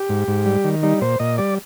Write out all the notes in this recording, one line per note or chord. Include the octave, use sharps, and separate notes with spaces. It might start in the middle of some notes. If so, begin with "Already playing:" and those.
Already playing: G4
G#2
G#2
G3
D#3
G3 D#4
A#2 C5
A#2 D#5
G3 D5